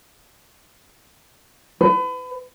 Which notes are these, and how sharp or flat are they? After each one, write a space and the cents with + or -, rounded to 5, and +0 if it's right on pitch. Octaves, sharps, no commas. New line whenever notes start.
B4 +35